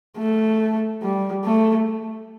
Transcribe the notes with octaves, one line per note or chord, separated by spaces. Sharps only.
A3
G3
A3